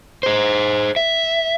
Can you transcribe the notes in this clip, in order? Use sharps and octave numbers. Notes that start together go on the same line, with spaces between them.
G#4 C5
E5